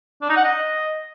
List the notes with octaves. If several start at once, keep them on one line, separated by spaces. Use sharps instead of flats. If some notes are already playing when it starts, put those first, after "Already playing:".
D4
D#4
F#5
D#5